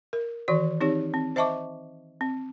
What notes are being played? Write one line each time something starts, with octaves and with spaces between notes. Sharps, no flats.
A#4
D#3 E3 F#4 D5
C4 D#4 G4 C#5
C4
C5 D#5 E5 A5 C#6 D6
C4